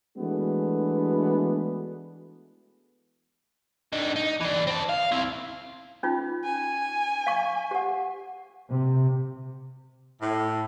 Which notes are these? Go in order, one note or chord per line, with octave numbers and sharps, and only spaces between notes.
E3 G#3 A3 B3 D4 F#4
D3 D#4
D#4
E3 D4
C4 A5
F5
C4 E4
C#4 D#4 F4
G#5
F5 C#6
G4 F#5
C3
A2